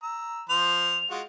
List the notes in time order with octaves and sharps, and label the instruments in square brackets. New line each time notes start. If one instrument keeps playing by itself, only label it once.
[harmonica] A#5 E6
[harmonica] F3 C5 [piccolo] F7
[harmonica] G#3 F4 F#4